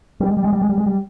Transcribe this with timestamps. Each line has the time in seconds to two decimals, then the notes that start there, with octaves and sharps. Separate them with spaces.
0.20 G3
0.28 G#3
0.37 G3
0.44 G#3
0.53 G3
0.62 G#3
0.69 G3
0.78 G#3
0.86 G3